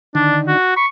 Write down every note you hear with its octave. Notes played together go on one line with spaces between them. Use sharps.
D3 D#3 D4
F#4
B5 C#6